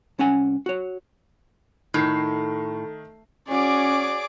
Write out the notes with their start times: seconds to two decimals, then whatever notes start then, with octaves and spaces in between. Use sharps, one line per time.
0.19 C2 C#4 F#5 G#5
0.66 F#4 C#5
1.94 A2 D#3 C7
3.49 C#4 F#4 G#4 C#5 D5 D6